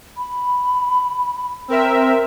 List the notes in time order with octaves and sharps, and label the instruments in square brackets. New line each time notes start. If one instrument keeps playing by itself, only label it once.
[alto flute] B5
[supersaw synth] C4 A#4 E5